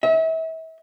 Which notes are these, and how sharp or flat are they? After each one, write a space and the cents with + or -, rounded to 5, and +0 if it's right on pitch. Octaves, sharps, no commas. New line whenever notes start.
E5 -35